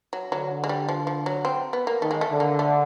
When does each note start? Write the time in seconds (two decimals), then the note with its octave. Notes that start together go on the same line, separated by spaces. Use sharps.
0.13 F#3
0.32 D3 F#3
0.64 G#3
0.69 G3
0.89 F3
1.07 F3
1.26 F#3
1.45 C4
1.73 B3
1.87 A#3
2.01 D#3 A3
2.11 G#3
2.21 A3
2.31 D3
2.40 A#3
2.59 A3